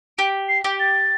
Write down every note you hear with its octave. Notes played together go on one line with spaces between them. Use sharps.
G4 D7
C7
G4
A6